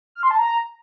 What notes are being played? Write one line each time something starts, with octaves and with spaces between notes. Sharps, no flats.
F6
C6
A5
A#5